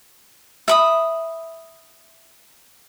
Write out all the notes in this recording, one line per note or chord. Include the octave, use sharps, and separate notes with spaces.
E5 B5 D#6